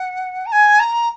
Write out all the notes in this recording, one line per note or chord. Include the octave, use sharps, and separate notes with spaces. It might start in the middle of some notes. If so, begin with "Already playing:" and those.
Already playing: F#5
A#5
G#5
A#5